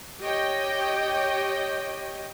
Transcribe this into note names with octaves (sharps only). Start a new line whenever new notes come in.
G4 C#5 D#5 G5